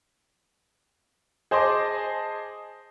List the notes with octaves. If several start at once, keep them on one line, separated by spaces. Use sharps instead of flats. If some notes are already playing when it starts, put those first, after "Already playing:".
G#4 C5 D#5 A5 C6 D6